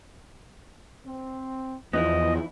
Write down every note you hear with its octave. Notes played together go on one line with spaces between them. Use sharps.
C4
E2 F3 B3 D#4 E4 D#5